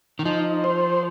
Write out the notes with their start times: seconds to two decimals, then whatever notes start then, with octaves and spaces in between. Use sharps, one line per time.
0.19 D#3
0.25 F3 D#4
0.64 C5